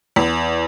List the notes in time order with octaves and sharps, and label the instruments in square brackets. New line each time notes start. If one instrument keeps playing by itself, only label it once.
[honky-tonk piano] E2